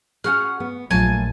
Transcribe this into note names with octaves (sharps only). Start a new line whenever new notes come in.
C#4 F#4 G#4 F#5 G#5 F6
B3
A#1 F#3 A3 F4 G#5 A5